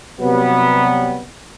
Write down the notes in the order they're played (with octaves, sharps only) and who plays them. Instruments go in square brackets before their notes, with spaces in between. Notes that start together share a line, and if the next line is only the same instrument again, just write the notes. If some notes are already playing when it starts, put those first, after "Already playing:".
[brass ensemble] C3 F#3 G3 B3